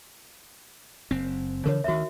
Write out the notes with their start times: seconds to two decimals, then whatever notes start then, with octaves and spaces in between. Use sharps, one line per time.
1.11 F#1 C4
1.66 C#3 E3 F3 A#4 C#5
1.84 D2 D#3 F#4 E5